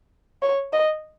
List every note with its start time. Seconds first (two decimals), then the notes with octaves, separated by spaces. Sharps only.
0.42 C#5
0.73 D#5